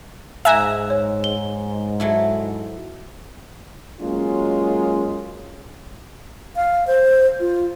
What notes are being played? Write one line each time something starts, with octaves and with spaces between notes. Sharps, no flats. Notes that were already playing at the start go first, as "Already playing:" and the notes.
G#2 E5 G#5 A#5 E6 F#6 E7
C#5
G7
F#3 A3 E4
F#3 G#3 A#3 C#4 F4
F5
C5
F4